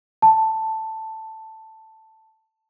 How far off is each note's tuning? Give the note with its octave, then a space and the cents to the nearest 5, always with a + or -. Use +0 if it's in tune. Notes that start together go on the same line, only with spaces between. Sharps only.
A5 +5